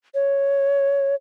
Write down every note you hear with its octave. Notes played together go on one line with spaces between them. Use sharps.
C#5